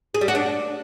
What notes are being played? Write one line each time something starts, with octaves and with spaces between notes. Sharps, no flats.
G#4
G3
F#4
D4